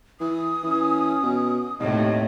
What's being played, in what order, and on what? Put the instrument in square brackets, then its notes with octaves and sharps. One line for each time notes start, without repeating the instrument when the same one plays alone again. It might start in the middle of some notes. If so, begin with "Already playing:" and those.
[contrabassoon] E3 [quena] D#6
[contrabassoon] E3 [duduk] C#4
[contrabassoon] B2
[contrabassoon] D#2 [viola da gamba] A2 C3 [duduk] C#5 [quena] D#5